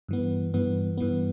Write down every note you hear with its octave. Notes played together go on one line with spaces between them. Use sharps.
G2 E3 B3
G2 E3 B3
G2 E3 B3